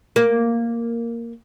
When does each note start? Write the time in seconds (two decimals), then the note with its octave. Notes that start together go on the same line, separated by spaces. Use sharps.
0.16 A#3